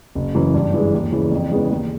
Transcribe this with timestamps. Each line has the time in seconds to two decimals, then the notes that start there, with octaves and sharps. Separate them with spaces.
0.15 F#1
0.35 F#2 C#3 E3
0.54 G2
0.74 E3 G#3
0.94 D#2
1.12 C#3 E3
1.32 F2
1.51 C#3 E3 G#3 B3
1.71 D#2